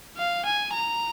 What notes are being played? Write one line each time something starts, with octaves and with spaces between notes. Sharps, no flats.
F5
G#5
A#5